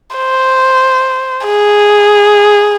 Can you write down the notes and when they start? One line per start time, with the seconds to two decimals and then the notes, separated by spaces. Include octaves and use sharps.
0.16 C5
1.46 G#4